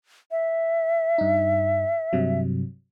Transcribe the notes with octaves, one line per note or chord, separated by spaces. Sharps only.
E5
G2 D#4
G2 C3 F#3